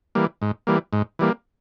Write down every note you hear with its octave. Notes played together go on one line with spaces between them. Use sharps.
E3 G3 A#3
G#2
E3 G3 A#3
G#2
E3 G3 A#3